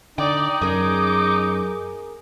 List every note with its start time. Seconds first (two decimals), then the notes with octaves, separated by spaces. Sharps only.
0.18 D3 D#4 D5 G5
0.61 F#2 G#4 A#4 D6